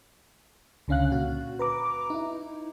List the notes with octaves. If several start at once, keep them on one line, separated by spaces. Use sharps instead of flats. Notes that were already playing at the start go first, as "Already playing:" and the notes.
C#2 D3 C#4 F5 F#6
A#2 F#4
B4 A#5 D6
D#4 E4